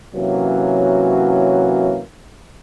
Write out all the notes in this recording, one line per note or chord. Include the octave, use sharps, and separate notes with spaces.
C3 E3 F#3 A#3 C#4 F#4